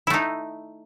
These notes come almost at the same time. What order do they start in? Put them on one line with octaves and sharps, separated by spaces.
E4 A3 D#4